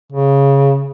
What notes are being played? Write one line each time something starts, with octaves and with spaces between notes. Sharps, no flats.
C#3